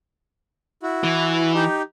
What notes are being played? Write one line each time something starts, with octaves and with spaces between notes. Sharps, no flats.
E4 F#4
E3
D#4 G4